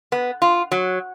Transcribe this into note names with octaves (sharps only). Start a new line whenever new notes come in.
B3
F4
F#3